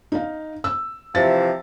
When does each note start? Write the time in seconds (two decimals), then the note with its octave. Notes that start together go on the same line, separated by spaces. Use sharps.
0.12 D#4 F5
0.64 E6
1.15 C3 E3 F3 A6